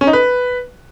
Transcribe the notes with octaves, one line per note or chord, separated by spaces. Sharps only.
C#4
D#4
B4